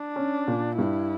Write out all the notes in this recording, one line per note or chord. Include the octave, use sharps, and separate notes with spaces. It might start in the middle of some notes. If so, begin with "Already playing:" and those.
Already playing: D4
C#4
A#2
G2 E4